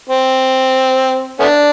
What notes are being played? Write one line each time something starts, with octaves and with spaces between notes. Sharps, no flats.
C4
A3 B3 D4